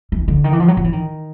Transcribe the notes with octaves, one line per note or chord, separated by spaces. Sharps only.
E3
D3
D#3
E3
F3
F#3
F3
E3
D#3